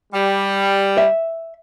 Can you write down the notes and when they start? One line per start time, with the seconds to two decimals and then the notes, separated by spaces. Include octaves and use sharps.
0.13 G3
0.98 E5